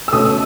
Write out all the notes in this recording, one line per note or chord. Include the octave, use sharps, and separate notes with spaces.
E6
B2 A3 C#4 D#6